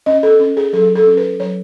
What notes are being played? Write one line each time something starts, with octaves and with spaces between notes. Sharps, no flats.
C#4 D#5
A4
C#4
G#4
F#3 A4
A4
C#4
B4
F#3 C#5